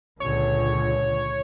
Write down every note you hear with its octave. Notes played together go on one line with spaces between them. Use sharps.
C#2 A#2 D3 C#5